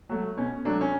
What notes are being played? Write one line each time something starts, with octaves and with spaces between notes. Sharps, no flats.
F#3 A3
B2 C#4
F#3 A3 D4
C#4